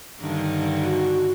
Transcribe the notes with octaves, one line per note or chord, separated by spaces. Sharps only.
G2 D3 D#3
F#4